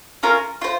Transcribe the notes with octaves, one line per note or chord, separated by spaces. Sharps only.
C#4 F4 A#4
F4 C5